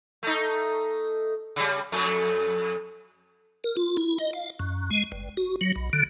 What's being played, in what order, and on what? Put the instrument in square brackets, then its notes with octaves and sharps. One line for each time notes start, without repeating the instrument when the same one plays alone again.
[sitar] A3 D#4
C#3 G3
F2 A3
[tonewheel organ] A#4
F4
E4
D#5
F5
F#2
G#3
G1
F#4
F#3
B1
D3